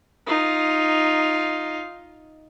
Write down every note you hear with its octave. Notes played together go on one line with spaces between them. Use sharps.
D#4 F4